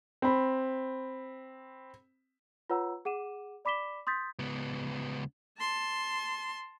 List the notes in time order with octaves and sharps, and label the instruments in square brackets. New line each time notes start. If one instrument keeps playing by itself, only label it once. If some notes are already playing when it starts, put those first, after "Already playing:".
[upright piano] C4 B5
[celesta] F4 B4 C#5 F#5 A#5 E6
G#4 F#5 D6 D#7 E7
D5 B5 D6 B6 E7 G7
C6 D#6 G6 A6 B6
[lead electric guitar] C#2 B3
[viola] A5 C6